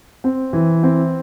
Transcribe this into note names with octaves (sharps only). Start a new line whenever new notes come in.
C4
E3
C4